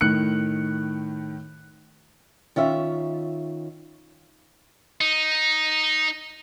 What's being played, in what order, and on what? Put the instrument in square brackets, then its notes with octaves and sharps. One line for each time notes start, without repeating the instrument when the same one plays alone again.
[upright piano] A2 D#3 F#6 C#7
[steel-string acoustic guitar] D#3 C#4 F4 E5
[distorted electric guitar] D#4